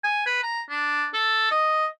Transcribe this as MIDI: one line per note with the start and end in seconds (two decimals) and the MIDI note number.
0.04 0.23 80
0.26 0.38 71
0.43 0.61 82
0.70 1.06 62
1.14 1.49 69
1.51 1.86 75